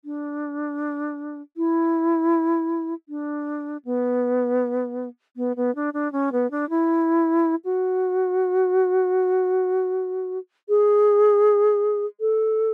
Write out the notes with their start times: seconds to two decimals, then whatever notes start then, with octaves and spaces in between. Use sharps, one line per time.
0.05 D4
1.57 E4
3.09 D4
3.85 B3
5.37 B3
5.56 B3
5.75 D4
5.94 D4
6.12 C#4
6.32 B3
6.51 D4
6.70 E4
7.65 F#4
10.69 G#4
12.20 A4